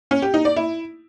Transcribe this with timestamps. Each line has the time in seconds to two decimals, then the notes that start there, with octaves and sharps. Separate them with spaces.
0.11 C#4
0.22 G4
0.34 D#4
0.45 D5
0.56 E4